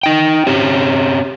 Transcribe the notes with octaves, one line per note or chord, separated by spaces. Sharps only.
D#4 G5
C4 C#4 G4